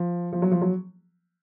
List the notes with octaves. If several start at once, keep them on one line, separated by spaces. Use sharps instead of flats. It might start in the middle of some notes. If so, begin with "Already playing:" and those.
Already playing: F3
F3
F#3
F3
F#3